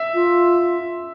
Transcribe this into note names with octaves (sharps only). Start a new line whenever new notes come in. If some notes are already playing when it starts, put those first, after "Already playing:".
Already playing: E5
F4